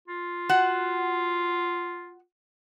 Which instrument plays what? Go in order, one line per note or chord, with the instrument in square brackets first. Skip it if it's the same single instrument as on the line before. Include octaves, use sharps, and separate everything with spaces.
[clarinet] F4
[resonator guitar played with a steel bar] F#4 F#5